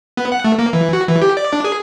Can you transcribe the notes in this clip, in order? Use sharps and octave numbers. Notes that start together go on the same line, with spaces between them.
B3
F#5
A3
A#3
E3
F#4
E3
G4
D5
D4
G#4